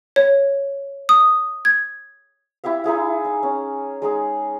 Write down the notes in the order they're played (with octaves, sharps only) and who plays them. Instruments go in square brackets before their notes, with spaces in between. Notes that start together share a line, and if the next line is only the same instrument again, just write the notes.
[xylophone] C#5
D#6
G#6
[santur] E4 G4 E5 F5
D#4 E4 G#4 F5
D#4
C#4
G#3 D#4 G#4